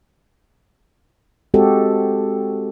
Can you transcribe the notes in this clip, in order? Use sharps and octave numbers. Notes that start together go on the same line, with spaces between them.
G#3 C4 F#4 G4 A4